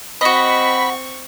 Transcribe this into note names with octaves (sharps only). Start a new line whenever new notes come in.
C4 F#4 D#5 B5 C#6